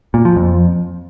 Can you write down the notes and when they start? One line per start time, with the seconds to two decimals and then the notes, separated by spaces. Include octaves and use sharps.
0.14 A#2
0.25 F3
0.36 F2